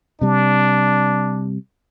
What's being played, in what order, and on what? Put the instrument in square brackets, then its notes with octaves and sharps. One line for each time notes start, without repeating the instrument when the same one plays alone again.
[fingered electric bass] C3 G3 [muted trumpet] D4